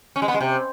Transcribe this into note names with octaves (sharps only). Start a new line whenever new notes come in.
C#4
G#3
B3
G#3
C3